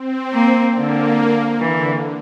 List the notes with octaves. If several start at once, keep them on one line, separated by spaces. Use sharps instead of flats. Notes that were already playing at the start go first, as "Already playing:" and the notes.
Already playing: C4
A#3
D3 A#3
D3 E3